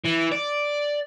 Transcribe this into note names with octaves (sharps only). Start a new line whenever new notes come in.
E3
D5